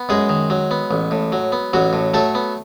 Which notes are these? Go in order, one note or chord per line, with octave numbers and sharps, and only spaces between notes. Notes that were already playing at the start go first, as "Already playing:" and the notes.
Already playing: B3
F#2 G#3 G#4
D#3
F#3
B3
A1
A2
F#3
B3
A1 F#3 F#4
A2
F#3 A3 A4
B3